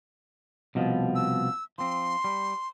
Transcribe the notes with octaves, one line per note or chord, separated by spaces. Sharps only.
C2 B2 F3
E6
F3 C4 C6
G3